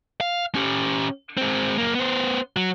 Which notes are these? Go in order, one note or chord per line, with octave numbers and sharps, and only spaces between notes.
F5
C#4 G4
G#3 C4
F#2 A#3
B3 C5
F#3